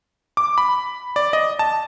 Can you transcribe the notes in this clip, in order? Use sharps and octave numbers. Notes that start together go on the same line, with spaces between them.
D6
B5
D5
D#5
A5